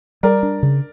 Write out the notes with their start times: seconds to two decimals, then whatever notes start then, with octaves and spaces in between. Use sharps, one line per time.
0.23 G3 A#4 D5
0.43 D4
0.63 C#3